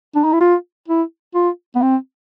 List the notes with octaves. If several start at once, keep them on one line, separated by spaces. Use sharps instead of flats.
D4
D#4
E4
F4
E4
F4
B3
C4